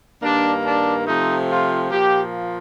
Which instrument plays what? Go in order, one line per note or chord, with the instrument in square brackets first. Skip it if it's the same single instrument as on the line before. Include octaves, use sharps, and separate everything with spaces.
[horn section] G2 D#3 A#3 D4
D4
C3 F3 A3 C4 D#4
F4
A#2 F3 A#3 G4